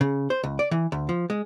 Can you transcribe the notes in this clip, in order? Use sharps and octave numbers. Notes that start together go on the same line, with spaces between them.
C#3
C5
C#2
D5
E3
D2
F3
G#3